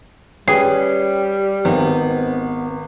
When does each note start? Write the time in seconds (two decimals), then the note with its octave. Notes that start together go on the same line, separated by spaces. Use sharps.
0.48 G3 C#4 G#4 B4 G5
1.65 G#1 B3 C4 D#4